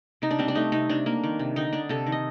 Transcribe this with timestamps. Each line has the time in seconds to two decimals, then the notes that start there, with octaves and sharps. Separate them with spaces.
0.22 C3 D#4
0.31 D4
0.39 G3 C4
0.48 D4
0.55 A3 D#4
0.72 C3 D#4
0.89 C3 D4
1.06 A#3
1.24 D#3
1.39 C3
1.56 D3 D#4
1.73 D3 D4
1.89 C3 A4
2.06 D#3
2.12 D#5